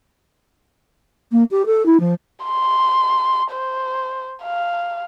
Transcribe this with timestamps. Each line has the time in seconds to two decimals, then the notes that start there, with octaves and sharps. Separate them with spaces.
1.32 A#3
1.51 G4
1.66 A4
1.86 E4
2.00 F3
2.45 C6
3.51 C5
4.43 F5